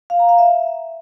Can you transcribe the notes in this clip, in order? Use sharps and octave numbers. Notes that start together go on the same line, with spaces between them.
F5
A#5
F5
E5